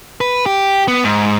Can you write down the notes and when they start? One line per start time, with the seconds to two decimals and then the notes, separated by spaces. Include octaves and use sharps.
0.21 B4
0.46 G4
0.88 B3
1.04 G#2